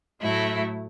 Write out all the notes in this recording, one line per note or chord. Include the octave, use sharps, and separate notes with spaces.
A2 F#3 A3 E4